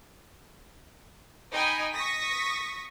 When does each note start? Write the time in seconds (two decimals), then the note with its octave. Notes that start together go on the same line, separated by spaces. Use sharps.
1.52 D#4 D#5 G5 G#5 B5 D#6
1.92 C#6 D#6 A#6 B6